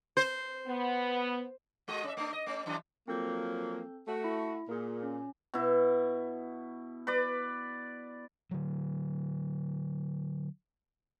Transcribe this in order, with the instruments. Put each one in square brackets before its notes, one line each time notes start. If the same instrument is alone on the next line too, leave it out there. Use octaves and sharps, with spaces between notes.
[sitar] C5
[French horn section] B3
[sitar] G#3 F#4 D#5
C#4 E5
A3 D4
D#5
A3 C#4
F#2 E3 D4
[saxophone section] F3 F#3 A#3 [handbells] C4 A4 G6
[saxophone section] A3 F#4
[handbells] E4
[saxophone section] A#2 [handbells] G#4 A#4
[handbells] C#4
[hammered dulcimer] B2 E4
B4 D5
[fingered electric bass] D3 F#3